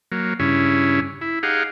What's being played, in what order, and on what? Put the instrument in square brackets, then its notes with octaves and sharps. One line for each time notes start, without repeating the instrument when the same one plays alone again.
[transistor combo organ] F#3 A#3
G2 C#3 C#4 E4
E4
D#4 G4 G#4 F5 F#5